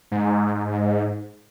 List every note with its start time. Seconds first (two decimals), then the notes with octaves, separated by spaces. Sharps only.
0.11 G#2